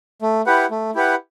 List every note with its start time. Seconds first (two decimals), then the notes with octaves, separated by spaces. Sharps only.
0.22 A3
0.46 E4 G4 B4 F#5
0.71 A3
0.95 E4 G4 B4 F#5